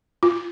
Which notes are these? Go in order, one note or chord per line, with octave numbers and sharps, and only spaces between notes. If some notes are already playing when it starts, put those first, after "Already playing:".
F4